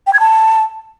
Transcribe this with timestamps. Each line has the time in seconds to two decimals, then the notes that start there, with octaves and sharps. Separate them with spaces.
0.07 G5
0.13 G#6
0.20 A5